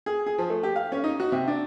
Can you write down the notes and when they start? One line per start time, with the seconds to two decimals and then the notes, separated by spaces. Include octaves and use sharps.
0.06 G#4
0.27 G#4
0.38 F3
0.50 A3
0.63 G4
0.76 F5
0.92 C#4
1.04 D#4
1.20 F#4
1.32 C3
1.48 D4